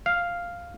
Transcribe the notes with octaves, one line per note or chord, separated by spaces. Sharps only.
F5